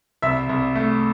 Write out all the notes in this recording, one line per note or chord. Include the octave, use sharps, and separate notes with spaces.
C2 E5
C2
A3